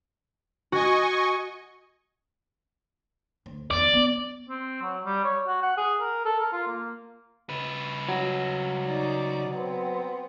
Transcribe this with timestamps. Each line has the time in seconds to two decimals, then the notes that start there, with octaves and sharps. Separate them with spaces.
0.72 F#4 D#5 G#5 C#6
3.46 D2
3.71 E2 D#3 D5
3.93 B3 D4
4.49 C4
4.82 F#3
5.06 G3
5.24 C#5
5.47 F#4
5.62 F#5
5.77 G#4
6.00 A#4
6.25 A4
6.40 A#4
6.53 F4
6.67 A#3
7.49 C#3 B4
8.09 F#3
8.86 D#4 D5
9.54 B3 C4